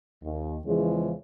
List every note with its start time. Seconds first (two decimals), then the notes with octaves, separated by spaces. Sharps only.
0.23 D#2
0.65 E2 C#3 E3 F3 G#3 C#4